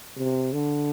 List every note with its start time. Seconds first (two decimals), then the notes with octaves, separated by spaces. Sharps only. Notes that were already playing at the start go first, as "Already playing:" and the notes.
0.17 C3
0.53 D3